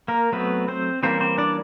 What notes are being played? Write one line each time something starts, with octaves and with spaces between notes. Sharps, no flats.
A#3 A#4
F#3 A3 B3 C4 B4
C4 C5
E3 G3 A#3 C4 C#4 C5
C4 C5
D4 D5